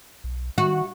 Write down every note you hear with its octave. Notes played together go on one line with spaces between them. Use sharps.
B1
D#3 F#4